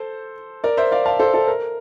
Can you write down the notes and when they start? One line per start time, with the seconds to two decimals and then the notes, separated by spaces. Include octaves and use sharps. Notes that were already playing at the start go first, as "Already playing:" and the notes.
Already playing: A4 C5
0.64 A#4 D5
0.77 C5 E5
0.92 D5 F5
1.06 F5 A5
1.20 A4 C5
1.34 A4
1.48 A#4